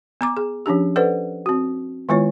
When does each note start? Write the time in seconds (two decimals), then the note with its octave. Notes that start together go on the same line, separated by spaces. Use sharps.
0.21 B3 A#5 D6
0.37 G#4
0.66 F3 C#4 D4 G4
0.96 A4 B4 C5 D5 F#5
1.46 C4 F#4
2.09 D#3 G#3 B3 E4 F4 C#5